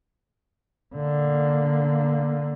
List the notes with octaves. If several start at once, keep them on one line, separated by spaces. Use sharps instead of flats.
D3 A#3